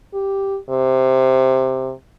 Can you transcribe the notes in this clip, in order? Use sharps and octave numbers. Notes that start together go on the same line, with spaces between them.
G4
C3